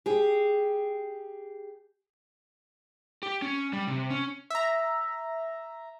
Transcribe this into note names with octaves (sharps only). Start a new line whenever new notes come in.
G4 G#4
G4
C#4
G3
C3
C#4
E5 A#5